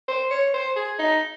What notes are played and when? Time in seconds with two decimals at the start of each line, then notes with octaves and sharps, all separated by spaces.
0.09 C5
0.31 C#5
0.54 C5
0.76 G#4
0.99 D#4